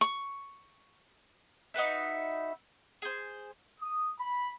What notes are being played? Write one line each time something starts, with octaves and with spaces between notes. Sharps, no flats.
C#6
D#4 F#4 B4 E5
G#4 C5
D#6
B5